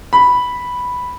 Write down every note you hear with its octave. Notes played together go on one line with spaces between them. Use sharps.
B5